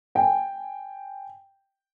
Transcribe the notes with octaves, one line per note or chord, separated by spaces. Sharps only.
G5 G#5